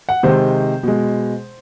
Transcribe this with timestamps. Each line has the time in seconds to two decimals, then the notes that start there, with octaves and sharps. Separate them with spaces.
0.09 F#5
0.23 C3 D#3 G#3 C5
0.83 B2 G#3